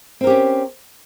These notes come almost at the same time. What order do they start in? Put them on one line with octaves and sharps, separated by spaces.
C4 A#4 G4 C#4